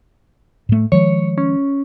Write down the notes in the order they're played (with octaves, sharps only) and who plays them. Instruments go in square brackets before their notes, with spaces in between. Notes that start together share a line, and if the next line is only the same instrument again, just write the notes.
[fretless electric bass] A2 A3
[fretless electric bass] D#3 F3 G#3 [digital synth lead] C#5
[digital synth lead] C#4